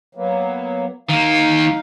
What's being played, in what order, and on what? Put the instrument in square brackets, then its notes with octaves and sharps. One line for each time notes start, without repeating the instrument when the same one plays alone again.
[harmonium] F#3 A#3 B3
[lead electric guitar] D#3 A#3 [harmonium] D#4 F5